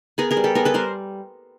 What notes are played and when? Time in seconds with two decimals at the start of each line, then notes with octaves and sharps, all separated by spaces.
0.18 B3 G#4 A#4
0.31 G#4 A#4
0.37 G3
0.44 G4 A4
0.55 B3 G#4 A#4
0.65 A4 B4
0.74 G3 A#4 C5